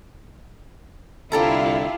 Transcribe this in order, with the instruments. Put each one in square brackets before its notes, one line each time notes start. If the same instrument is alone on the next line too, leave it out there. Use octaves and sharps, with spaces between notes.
[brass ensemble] C2 D3 [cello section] E4 F4 [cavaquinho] G4 A4 A#5